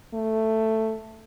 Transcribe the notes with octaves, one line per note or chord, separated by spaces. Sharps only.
A3